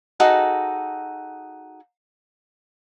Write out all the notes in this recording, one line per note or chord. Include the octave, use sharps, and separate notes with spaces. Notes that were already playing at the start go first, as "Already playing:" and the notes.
D#4 F#4 G#4 A4